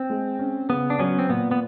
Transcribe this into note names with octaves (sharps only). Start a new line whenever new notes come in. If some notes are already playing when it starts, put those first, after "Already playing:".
Already playing: C4
G#3
C#4
C#3 B3
D4
F#3 B3 C#4
C4
A#2 B3
B3